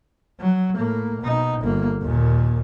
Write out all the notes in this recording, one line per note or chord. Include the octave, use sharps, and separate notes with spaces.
F#3
A2 A#3
B2 D#4
G1 A#3
D#2 A#2